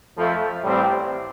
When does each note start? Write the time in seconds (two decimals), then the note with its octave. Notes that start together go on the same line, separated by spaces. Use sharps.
0.15 F2 F3 A3 F4
0.64 A1 A2 G3 C4